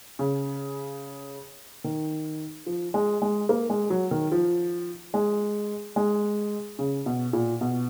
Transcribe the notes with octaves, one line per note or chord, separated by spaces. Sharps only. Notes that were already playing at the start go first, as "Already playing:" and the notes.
C#3
D#3
F3
G#3
G#3
A#3
G#3
F#3
D#3
F3
G#3
G#3
C#3
B2
A#2
B2